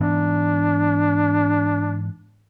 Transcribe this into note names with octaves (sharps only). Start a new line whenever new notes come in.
G#2 E3 B3 D4